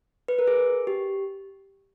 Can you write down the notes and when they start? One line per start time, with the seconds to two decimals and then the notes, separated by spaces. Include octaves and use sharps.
0.28 B4
0.39 A#4
0.47 G#4
0.87 G4